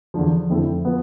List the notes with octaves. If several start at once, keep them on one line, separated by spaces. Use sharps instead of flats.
E2 D3 F3
F2 D3 A3 C4 E4
F3 B3